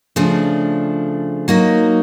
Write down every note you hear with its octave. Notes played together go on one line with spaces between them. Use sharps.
C#3 F3 A3 D4
F#3 A#3 D#4